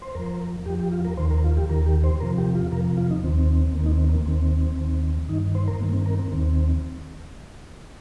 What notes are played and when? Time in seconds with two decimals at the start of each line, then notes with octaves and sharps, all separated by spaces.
0.02 C5
0.15 F2 F3 A#4
0.66 F2 F3 G4
0.80 G4
0.92 F4
1.05 A#4
1.17 D#2 D#3 C5
1.31 A#4
1.44 F4
1.57 G4
1.69 D#2 D#3 A#4
1.86 G4
2.04 C5
2.20 F2 C3 F3 A#4
2.38 G4
2.55 F4
2.72 F2 C3 F3 A#4
2.98 F4
3.10 D#4
3.23 D#2 D#3 C4
3.75 D#2 D#3 A#3
3.86 D#4
3.92 C4
4.09 A#3
4.26 D#2 D#3 C4
4.77 D#2 D#3
5.29 G2 D#3 D#4
5.55 C5
5.68 A#4
5.80 G2 D#3 A#3
5.93 C4
6.06 A#4
6.19 C4
6.32 D#2 D#3 C4